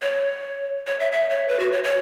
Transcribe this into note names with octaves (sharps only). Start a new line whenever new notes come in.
C#5
C#5
E5
E5
C#5
B4
F#4
C#5
C#5